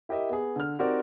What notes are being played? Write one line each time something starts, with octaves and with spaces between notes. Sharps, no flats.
E4 G4 A#4 D#5 E5
B3 G#4
D3 F6
C4 D#4 F#4 G4 A#4 D5